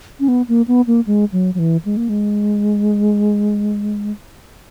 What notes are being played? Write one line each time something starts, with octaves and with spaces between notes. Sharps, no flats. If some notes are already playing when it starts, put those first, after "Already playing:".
C#4
B3
A#3
B3
A#3
G#3
F#3
F#3
E3
G#3
A#3
G#3